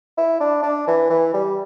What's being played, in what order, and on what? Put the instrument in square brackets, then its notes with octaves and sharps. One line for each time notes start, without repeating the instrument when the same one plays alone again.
[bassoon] E4
D4
D4
E3
E3
G3